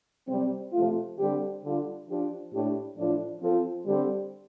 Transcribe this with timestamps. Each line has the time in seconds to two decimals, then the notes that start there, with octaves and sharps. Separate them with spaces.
0.28 C3 G3 C4
0.73 C3 F3 A3 F4
1.18 D3 G3 C4 G4
1.62 D3 G3 F4
2.07 F3 D4 G4
2.52 A2 A3 D4 G4
2.96 A2 F3 D4 F4
3.41 F3 C4 F4 A4
3.85 D3 G3 C4 G4